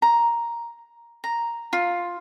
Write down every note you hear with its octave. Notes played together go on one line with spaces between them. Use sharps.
A#5
A#5
F4